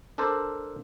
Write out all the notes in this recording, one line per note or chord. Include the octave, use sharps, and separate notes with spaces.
D4 A4 A#4 C5 D5